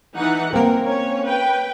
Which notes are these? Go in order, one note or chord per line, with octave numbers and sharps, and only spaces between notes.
E3 D#4 F#5
A#3 C4 A#4
C#4 C#5
B4 G5